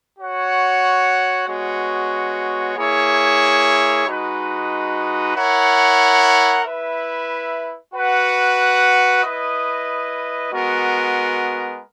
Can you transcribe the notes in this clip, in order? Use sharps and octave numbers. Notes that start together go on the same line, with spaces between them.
F#4 C#5 F#5
G#3 B3 F#4 C#5
A#3 E4 G#4 C#5
G#3 D#4 F#4 B4
E4 A#4 C#5 F#5
E4 B4 E5
F#4 B4 F#5
E4 B4 D#5
G#3 B3 F#4 A#4